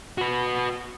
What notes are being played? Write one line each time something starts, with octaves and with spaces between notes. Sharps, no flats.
F#4 B4